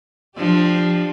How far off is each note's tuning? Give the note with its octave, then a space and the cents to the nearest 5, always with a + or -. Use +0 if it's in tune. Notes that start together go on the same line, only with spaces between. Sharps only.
F3 +0 D4 +15 G4 +0